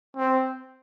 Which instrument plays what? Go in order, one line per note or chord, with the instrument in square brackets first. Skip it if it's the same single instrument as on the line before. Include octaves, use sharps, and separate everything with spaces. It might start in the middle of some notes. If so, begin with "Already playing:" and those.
[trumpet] C4